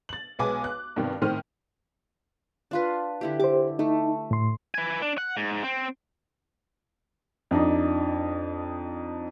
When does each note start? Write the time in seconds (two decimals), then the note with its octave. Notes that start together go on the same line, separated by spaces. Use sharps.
0.09 A6 F#7
0.39 B1 G#3 B3 B4 G#5 D6
0.64 F#6
0.96 G2 B2 D#3 C4
1.22 A2 D#3 C4 C5 F6 D#7
2.71 D4 F4 B4
3.21 D3 E4 G4
3.40 G4 C5 D6
3.79 A3 D#4
4.31 A2 C6
4.75 B4 G#5
5.02 D4
5.18 F#5
5.37 G#2
5.63 C4
7.51 F2 D4 D#4